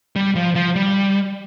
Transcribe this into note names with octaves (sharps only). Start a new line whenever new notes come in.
G3
F3
F3
G3